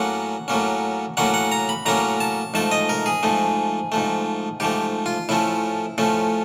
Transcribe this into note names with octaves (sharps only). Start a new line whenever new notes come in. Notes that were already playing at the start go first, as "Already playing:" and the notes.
Already playing: A2 F#3 A#3 C#4 F#5
A2 F#3 A#3 C#4
A2 F#3 A#3 C#4 F#5
F#5
A#5
B5
A2 F#3 A#3 C#4 A#5
A5
G#2 F3 A3 A5
D#5
A#4
G#4
G#2 F3 A3
G#2 F3 A3
G#2 F3 A3 G4
F4
A2 F3 A3 C#4 E4
A2 F3 A3 C#4